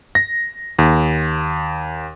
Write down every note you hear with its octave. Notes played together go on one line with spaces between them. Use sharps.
A#6
D#2